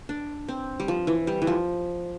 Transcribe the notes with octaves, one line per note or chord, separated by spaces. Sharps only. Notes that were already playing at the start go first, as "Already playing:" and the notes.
D4
C4
G3
F3
E3
G3
E3
F3